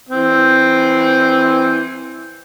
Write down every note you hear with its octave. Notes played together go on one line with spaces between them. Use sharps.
E3 C4